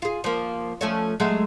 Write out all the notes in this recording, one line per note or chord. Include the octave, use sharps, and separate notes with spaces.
F4 G#4
F3 A#3
F3 A3 C#4
F#3 G#3 A3